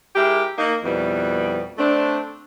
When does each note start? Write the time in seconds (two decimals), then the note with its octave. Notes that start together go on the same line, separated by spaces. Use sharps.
0.15 G#3 E4 G4 A#4
0.58 A#3 D#4
0.84 F2 B2 G3 B3 E4
1.78 A3 C4 D4